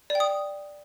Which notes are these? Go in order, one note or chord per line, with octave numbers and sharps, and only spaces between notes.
D5
G5
D#6